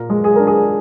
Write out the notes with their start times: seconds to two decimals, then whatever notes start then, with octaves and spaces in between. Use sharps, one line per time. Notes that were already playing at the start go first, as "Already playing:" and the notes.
Already playing: A#2 A#4
0.10 G#3
0.24 G#4
0.36 D4 A#4
0.47 G#4